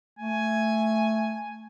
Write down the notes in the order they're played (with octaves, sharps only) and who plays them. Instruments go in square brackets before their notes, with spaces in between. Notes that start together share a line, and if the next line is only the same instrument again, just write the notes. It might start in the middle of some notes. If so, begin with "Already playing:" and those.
[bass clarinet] A3 [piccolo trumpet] G#5